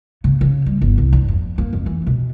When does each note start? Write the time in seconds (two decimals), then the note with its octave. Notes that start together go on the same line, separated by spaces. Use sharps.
0.24 C#3
0.41 C#3
0.66 G3
0.81 G1
0.98 C2
1.13 G2
1.28 F2
1.58 A#3
1.73 F2
1.86 E3
2.07 B2